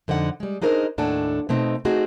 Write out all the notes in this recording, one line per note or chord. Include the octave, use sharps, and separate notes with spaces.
F2 D3 D#4 F#5
G3 G#3
D4 D#4 G#4 A#4 C5 D#5
D#2 A2 D4 A4 F#5 G#5
B2 A3 C4 D#4
A3 C4 D#4 F#4 G#4